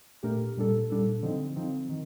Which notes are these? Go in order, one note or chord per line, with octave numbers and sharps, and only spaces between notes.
A#2 A3 D4 G4 A#4
A#2 G3 D4 A4
A#2 G3 D4 A4
D3 F3 C4 D#4
D3 F3 C4 D#4
D#3